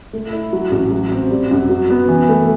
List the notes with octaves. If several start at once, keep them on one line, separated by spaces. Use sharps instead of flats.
A3
E4
F#3
A1
F#3
C4
G3
F#2
F#3
B3
E3
A3